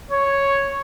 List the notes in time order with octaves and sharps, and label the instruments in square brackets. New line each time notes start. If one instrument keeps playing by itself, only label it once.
[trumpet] C#5